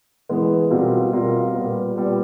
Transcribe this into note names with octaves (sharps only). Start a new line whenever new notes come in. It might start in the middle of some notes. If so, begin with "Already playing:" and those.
E3 G#3 B3
B2 G3 C4 F4 A#4
B2 G3 C4 F4 A#4
A#2 G3 B3
A#2 G3 B3